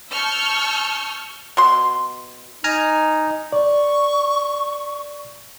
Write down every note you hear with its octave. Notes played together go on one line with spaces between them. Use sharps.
A5 C#6 E6 F6 G6
B2 C6
D#4 G#5 A#5 F6
D5 C#6